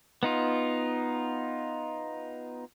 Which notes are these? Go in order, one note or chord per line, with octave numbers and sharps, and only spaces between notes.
B3 D#4 F4